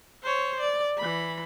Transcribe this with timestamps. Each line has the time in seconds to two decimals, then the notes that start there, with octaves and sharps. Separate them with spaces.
0.23 C5 C#5
0.60 D5
0.98 E3 B5